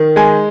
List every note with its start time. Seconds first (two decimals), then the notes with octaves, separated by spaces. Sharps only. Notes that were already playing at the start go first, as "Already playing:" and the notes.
Already playing: D#3
0.16 G#3 G#5